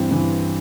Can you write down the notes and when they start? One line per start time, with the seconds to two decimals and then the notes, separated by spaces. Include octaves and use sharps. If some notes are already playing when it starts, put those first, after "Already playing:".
Already playing: G2 E3 C4
0.11 G2 E3